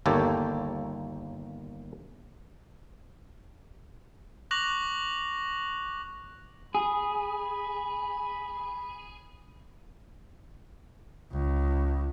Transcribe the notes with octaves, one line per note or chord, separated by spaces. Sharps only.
G1 D#2 A#3 G4 A4 C#5
C#6 D6 F#6 A#6 F7 F#7
G#4 B5
C#2